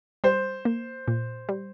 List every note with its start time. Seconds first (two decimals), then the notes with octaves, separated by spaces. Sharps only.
0.24 G3 C5
0.65 A#3
1.08 A#2
1.49 G3